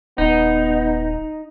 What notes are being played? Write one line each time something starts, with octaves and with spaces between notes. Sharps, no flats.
D#1 B3 D#4